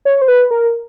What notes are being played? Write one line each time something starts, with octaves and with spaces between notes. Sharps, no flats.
C#5
C5
B4
A#4